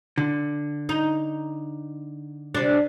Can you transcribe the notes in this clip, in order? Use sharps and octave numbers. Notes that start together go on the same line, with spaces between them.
D3
D#4
C3 D4